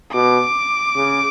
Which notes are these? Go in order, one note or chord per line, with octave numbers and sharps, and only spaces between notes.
B2 D6
C#3